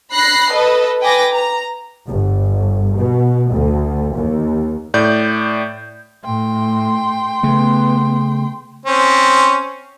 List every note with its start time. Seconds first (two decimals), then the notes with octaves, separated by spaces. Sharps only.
0.13 B5 F#6 A#6 C7
0.52 A4 B4 D#5
1.01 B4 G5 G#5 D6 A#6
1.33 A#5
2.08 G1
2.99 B2
3.54 D2
4.16 D#2
4.94 A2 D5 G6
6.25 A2 G5 C6
7.43 C#3 A3 B3
8.86 C4 C#4